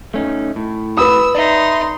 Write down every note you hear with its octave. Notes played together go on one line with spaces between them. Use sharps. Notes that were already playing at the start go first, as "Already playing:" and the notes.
A3 C#4 D#4
A2
B4 B5 D#6 E6
D#4 D5 E5 C6